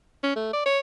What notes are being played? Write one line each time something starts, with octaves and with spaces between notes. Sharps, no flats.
C#4
A3
D5
C#5